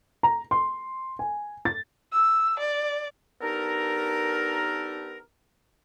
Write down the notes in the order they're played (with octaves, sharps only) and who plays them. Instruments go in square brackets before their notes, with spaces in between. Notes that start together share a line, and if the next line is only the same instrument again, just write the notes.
[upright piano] A#5
C6
G#5
A6
[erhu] E6
D5
[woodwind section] B3 D4 D#4 G4 A4 A#4